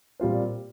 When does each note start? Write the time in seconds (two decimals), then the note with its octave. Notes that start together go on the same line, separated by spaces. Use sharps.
0.20 A#2 G3 C4 F4 C5